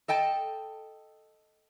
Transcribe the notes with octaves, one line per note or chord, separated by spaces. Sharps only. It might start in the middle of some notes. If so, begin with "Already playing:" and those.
A4 D#5 G5 A5